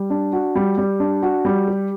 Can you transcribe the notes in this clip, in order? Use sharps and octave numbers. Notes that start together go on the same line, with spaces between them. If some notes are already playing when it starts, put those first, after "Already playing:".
Already playing: G3
D4
F#4
G3
G3
D4
F#4
G3
G4